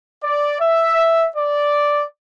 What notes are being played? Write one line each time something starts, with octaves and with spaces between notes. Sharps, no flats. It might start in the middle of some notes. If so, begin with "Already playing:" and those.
D5
E5
D5